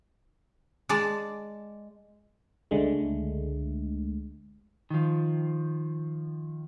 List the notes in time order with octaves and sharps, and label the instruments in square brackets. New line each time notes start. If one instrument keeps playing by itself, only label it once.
[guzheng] G#3 D5 A5
[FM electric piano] C#2 D3 G#3 A3
[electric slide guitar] D#3 F3